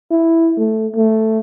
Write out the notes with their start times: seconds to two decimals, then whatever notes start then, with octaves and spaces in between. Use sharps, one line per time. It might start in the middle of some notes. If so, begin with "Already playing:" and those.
0.11 E4
0.58 A3
0.96 A3